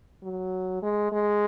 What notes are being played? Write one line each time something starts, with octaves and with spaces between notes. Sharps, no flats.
F#3
G#3
G#3